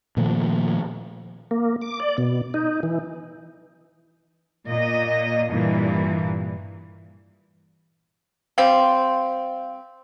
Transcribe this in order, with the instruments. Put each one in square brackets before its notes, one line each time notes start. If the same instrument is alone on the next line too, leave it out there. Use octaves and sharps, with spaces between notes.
[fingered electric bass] A#2 D#3 F3 A3
[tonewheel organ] A#3
D6
D5
B2
D#4
E3
[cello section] A#2 D#5
G2 A#2 E3
[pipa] G3 C4 [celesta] F5